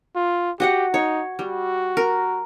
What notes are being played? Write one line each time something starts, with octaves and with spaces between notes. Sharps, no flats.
F4
F#4 G4 D#5 F#5
D#4 C#5
G3 F#4
A#4